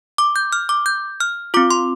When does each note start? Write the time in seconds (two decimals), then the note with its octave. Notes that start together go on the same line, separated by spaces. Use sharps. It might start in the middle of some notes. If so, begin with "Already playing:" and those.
0.18 D6
0.36 G6
0.53 F6
0.69 D6
0.86 G6
1.20 F6
1.54 C4 F4 D6
1.71 C6